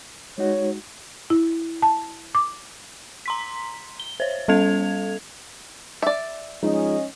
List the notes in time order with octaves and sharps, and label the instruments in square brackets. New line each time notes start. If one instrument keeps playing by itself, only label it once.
[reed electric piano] G#3 D#4 F#4 [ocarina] C#5
[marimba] E4
A5
D6
[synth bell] A#5 C6 B6
G7
C5 C#5
G3 C#4 A4 F5 G#6 F7
[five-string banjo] D5 E5
[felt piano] F3 G#3 D#4 [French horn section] C#4 D#5